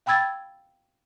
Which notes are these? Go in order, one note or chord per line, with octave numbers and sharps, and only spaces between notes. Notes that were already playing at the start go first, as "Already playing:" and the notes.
F5 G5 B5 E6 G#6 A6